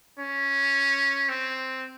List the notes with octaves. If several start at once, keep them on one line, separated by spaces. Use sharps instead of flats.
C#4
C4